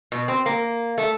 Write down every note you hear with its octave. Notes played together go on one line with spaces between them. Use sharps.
B2
C4
A#3
A3